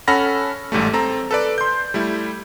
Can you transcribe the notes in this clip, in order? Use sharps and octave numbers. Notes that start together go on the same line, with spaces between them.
C#4 A4 F#5 B5 F6 A#6
A1 G#2 G3 A3
C4 A4 A#5
A4 B4 D5
C6 G6
G3 A3 E4